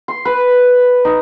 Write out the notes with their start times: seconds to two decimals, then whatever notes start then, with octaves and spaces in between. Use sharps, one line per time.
0.08 C6
0.25 B4
1.05 D#4